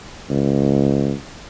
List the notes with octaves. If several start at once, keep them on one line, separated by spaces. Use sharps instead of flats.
C#2